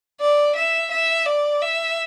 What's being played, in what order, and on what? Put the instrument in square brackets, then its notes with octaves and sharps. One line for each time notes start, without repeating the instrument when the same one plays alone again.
[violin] D5
E5
E5
D5
E5